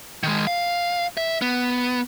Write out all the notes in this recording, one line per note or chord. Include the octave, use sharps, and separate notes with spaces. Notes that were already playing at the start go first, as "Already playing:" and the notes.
D#3 G#3
F5
E5
B3